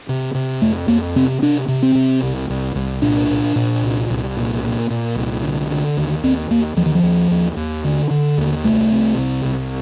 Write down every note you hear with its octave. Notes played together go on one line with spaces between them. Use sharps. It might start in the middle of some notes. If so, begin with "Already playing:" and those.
C3
C3
F2 A3
F2 A#3
C3 C4
C3 D4
C3
C4
C3
C2
C2
C2
A#2 D4
A#2
A#2
C2
C2
A#2
A#2
A#2
C2
D3
D3
D#2
D#2 C4
D#2 A#3
D#2 F3
D#3
F3
D#2
D#2
D#2
D3
D3
D#2
C2 A3
C3
C2
C2